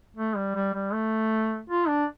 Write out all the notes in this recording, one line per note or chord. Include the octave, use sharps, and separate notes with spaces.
A3
G3
G3
G3
A3
F4
D4